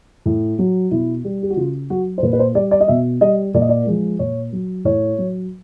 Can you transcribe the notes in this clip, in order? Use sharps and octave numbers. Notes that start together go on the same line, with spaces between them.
A2
F#3
B2 E4
G3
G4
F#4
C#3 F4
F#3 F#4
C5
A#2 B4
B4
C5
G3 D5
D5
D#5
B2 E5
G3 D#5
A#2 D5
D#5
D5
F3 G#3
A#2 C#5
F#3
A2 C#5
F#3